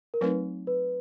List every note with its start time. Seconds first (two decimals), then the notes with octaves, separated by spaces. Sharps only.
0.14 A#4
0.21 F#3 A3 C4 D#4 B4
0.67 B4